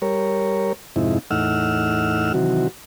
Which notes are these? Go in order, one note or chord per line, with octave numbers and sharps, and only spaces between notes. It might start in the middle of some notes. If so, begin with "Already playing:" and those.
G3 A#4 C#5
F2 G#2 C3 D#4 E4
E2 A2 D#4 F#5 E6 F6
C3 D#3 E3 F#3 F#4